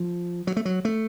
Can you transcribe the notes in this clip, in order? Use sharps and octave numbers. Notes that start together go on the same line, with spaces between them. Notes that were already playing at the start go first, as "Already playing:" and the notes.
Already playing: F3
F#3
A3
F#3
A3